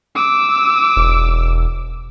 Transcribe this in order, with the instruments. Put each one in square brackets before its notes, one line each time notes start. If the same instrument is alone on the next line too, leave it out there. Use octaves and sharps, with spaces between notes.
[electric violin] D6 E6
[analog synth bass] E1